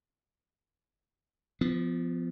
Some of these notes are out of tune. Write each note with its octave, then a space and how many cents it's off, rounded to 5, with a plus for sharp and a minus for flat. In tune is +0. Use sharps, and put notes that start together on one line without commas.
F3 -10 B3 +30